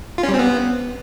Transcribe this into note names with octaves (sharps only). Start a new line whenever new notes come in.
F4
C#4
G3
C4
B3